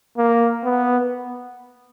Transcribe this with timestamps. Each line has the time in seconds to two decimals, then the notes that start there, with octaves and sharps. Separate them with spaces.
0.17 A#3
0.64 B3